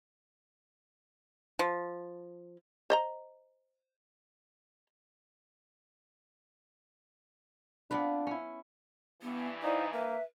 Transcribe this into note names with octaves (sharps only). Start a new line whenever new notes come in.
F3
C5 D#5 A#5
B3 C4 D4 F4 B4 D5
C#4 E4
G2 E3 B3
D#4 E4 C5 D5 F5
A#3 B4 E5